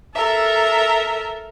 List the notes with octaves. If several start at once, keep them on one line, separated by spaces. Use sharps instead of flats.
A4 A#4 E5